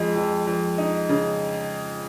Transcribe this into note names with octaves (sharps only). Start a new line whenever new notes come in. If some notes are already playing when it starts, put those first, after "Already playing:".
Already playing: F2 G#3
F2
F2
D#4
C#3